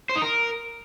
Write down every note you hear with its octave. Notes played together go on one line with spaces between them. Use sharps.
C5
D#4
A#4